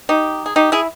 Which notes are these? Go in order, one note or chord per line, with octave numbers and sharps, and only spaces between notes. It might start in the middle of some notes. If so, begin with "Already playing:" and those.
D#4 G4
G#4
D#4 G4
E4 G#4